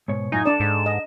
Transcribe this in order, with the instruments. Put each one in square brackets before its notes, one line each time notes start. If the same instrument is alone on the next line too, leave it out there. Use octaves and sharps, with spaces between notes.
[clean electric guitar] G#2 B2 C#5
[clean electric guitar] F#2 A2 F4 [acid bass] D#4 [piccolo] G#5
[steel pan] D4 D5 [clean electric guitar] A4 [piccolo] E7
[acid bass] G#2
[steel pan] D#5